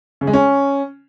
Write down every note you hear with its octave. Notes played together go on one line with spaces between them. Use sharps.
C#3
G#3
C#4